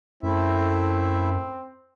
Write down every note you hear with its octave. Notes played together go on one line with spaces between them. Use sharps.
F#2 A3 C4 E4 E5